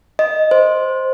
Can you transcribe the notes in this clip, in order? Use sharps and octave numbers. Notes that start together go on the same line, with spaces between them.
D#5
C5